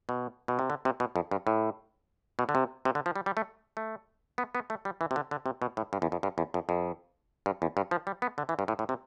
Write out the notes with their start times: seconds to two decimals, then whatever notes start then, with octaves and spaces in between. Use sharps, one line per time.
0.09 B2
0.48 B2
0.59 C3
0.70 D3
0.85 C3
1.00 B2
1.16 F2
1.31 G2
1.47 A2
2.39 B2
2.49 D3
2.55 C3
2.85 C3
2.95 D3
3.06 F3
3.16 G3
3.26 G3
3.37 A3
3.77 A3
4.38 B3
4.55 B3
4.70 A3
4.85 G3
5.01 E3
5.11 C3
5.16 D3
5.31 D3
5.46 C3
5.62 B2
5.77 A2
5.93 G2
6.02 E2
6.12 F2
6.23 G2
6.38 E2
6.54 F2
6.69 F2
7.46 G2
7.62 E2
7.77 G2
7.91 F3
8.07 G3
8.22 B3
8.38 D3
8.49 E3
8.59 G2
8.68 A2
8.79 A2
8.89 C3